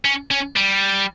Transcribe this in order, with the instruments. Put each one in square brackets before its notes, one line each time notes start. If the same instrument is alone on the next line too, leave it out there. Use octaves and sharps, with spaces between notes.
[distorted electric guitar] C#4
C#4
G3